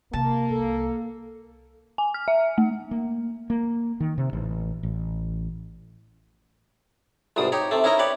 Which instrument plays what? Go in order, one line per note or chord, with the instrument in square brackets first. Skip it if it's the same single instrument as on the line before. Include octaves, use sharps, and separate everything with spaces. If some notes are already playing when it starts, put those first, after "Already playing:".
[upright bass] C3 [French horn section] A#3 [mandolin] A5
[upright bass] C2 [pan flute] A4
[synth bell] G#5
F6
E5
A3
[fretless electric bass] A#3
A#3
D#3
C3
A1
A1
[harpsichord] C2 G#2 B2 D#6
D#4 G4 C#5
C3 A3
C#4 D#4 E4 A#4 D#5
G4 B4 C#5 D5